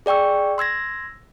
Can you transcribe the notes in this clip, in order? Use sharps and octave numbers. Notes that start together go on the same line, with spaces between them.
G#4 D5 G5 C#6 E6
C6 E6 G#6 A#6